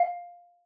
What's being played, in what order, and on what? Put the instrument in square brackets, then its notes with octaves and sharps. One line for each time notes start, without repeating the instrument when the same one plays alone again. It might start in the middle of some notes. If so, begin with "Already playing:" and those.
Already playing: [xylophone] F5